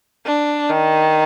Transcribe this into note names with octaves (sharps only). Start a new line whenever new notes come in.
D4
D#3